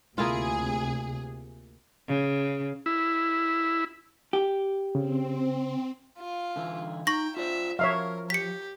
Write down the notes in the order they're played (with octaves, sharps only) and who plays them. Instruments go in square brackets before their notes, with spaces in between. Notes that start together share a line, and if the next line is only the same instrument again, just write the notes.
[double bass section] D2 C3 [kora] A#3 E4 F4 [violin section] G#4
[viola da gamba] C#3
[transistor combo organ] E4
[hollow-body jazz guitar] G4
[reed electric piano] C#3 [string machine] C4
[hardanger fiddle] F4
[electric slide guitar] D3 E3 E4
[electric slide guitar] D#4 [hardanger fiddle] G5 [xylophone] C#6 A#6
[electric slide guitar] F4 C5 D5 [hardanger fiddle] E5
[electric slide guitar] F3 [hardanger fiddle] A#4 [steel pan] C#5 E5 F5
[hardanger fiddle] G4 [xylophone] B6 C#7